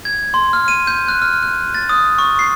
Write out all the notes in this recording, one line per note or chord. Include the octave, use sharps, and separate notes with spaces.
G#6
C6
F6
D#7
G6
F#6
F6
F#6
A6
D#6
C#6
C7